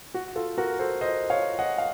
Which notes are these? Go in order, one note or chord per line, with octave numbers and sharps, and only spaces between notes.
F#4
F4 A4
F#4 A#4
A4 C5
C5 D#5
C#5 F5
D#5 F#5
F5